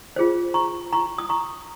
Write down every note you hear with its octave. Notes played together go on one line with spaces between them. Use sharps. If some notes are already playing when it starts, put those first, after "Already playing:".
F4 G#4 C5
A#5 C#6
A#5 C#6
D#6
A#5 C#6